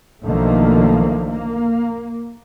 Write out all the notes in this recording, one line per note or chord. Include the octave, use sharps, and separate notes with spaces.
B1 D3 D#3 F3 A3 A#3
A#3